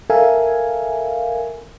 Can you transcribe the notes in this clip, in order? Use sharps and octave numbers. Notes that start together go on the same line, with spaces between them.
A4 A#4 E5 F5 G#5